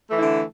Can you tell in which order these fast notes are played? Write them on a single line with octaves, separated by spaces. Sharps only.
A3 E3 E4 D3